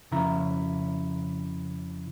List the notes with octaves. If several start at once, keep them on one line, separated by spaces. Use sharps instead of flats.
F2 C#3 E4 E5 A#5